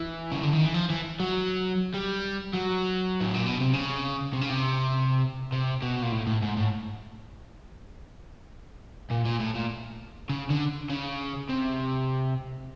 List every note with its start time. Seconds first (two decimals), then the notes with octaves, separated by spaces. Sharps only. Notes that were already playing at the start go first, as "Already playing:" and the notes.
Already playing: E3
0.32 C#3
0.43 D3
0.53 D#3
0.64 E3
0.74 F3
0.90 E3
1.20 F#3
1.94 G3
2.53 F#3
3.21 A2
3.34 A#2
3.46 B2
3.60 C3
3.73 C#3
4.33 C3
4.41 C#3
4.49 C3
5.52 C3
5.82 B2
6.02 A#2
6.12 A2
6.27 A2
6.42 G#2
6.57 A2
9.11 A#2
9.26 A#2
9.40 A2
9.55 A#2
10.29 C#3
10.50 D3
10.90 C#3
11.49 C3